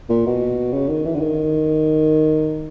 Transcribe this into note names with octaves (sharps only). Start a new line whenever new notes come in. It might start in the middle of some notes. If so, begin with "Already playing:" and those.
A#2
B2
C#3
D#3
E3
D3
D#3